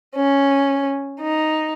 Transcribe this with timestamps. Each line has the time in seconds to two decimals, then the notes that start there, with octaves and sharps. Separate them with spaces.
0.16 C#4
1.21 D#4